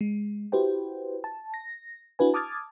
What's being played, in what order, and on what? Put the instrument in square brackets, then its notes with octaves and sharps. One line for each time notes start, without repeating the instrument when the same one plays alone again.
[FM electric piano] G#3
E4 F#4 G4 B4 C5 G5
A5
A#6
D4 E4 F#4 B4 G#5
A5 D6 D#6 F6 G#6 A6